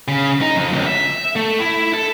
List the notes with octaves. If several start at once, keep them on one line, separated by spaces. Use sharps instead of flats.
C#3
D#4
F2
C#2
E5
A3
E4
A4